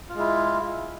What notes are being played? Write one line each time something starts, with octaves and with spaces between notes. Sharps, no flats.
G#3 E4 F4